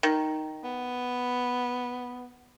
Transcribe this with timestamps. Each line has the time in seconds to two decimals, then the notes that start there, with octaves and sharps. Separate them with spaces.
0.03 D#3
0.64 B3